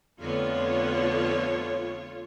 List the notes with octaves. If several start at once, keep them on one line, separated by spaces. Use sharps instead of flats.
F2 D3 A3 B3 F4 C#5